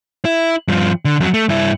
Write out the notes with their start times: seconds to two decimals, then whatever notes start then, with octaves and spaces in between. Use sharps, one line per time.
0.25 E4
0.68 G2 F3
1.05 D3
1.20 F2 F#3
1.34 A3
1.49 G2 E4